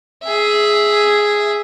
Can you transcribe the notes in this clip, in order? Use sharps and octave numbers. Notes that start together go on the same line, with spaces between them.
G#4 E5